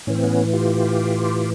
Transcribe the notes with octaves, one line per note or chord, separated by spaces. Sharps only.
A2 E3 C#4
C4
B3 C#4
F4 G4